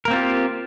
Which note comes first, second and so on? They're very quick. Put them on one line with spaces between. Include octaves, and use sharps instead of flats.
A#4 A#3 C4 F4 G4